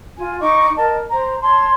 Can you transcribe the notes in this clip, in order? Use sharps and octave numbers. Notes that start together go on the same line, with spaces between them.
F4 G#5
D#4 D#5 C#6 D6
A#4 D#5 A5
C5 A#5
C#5 A5 C6